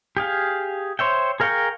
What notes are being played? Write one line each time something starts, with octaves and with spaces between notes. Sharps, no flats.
G4 G#4 F5
C5 C#5 E5 G5
G#4 A#4 F5 G5 C#6